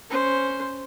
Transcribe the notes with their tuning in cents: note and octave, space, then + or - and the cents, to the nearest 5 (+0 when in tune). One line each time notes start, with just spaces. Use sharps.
C#4 +0 C5 +0